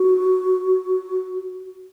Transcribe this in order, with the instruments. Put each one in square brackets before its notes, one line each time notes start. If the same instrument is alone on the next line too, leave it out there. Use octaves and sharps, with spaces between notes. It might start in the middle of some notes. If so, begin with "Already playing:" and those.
Already playing: [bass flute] F#4